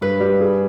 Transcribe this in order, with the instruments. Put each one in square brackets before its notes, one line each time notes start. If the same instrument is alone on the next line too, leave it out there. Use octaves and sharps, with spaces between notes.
[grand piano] G2 [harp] B4
[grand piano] G3
G#4